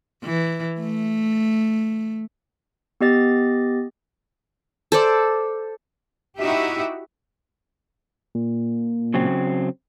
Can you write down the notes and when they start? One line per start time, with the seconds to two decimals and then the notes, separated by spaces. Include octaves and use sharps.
0.24 E3
0.80 A3
3.01 B3 G4 D#5 A6
4.92 A4 C5 D5
6.39 D#4 E4 F#4 G4 E5
8.35 A#2
9.14 C#3 F#3 C4